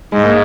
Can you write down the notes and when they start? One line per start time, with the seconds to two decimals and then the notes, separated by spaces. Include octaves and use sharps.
0.12 G#2 G#3
0.24 A#3